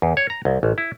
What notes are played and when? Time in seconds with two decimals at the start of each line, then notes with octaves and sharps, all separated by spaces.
0.02 E2
0.17 C#5
0.30 A#5
0.45 C2
0.63 A1
0.78 E4